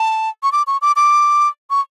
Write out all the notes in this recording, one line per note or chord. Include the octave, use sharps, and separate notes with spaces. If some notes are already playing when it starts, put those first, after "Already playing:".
Already playing: A5
C#6
D6
C#6
D6
D6
C#6